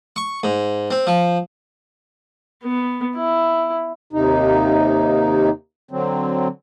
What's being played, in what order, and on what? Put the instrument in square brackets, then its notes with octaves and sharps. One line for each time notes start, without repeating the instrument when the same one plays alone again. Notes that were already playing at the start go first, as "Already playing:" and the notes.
[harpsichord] C#6
G#2
C4
F3
[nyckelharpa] B3
E4
[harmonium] D#2 C3 D#4
D3 F#3 C4